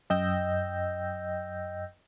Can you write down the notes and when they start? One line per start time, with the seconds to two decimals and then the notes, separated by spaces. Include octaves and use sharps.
0.10 F#2 D#5 G5 E6 G6 A#6